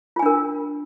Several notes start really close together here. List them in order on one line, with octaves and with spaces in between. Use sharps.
F4 G#5 D4 A#4